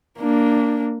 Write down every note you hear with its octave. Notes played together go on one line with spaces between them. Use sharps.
A#3 D4